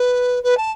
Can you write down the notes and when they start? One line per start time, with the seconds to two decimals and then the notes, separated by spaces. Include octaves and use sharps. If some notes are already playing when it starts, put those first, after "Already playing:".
Already playing: B4
0.43 B4
0.57 A5